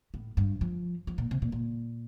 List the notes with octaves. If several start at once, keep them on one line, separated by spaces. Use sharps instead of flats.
A2
G2
F3
F3
A#2
C3
A#2
A#2